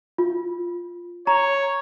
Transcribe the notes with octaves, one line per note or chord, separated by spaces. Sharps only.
F4
C#5 A#5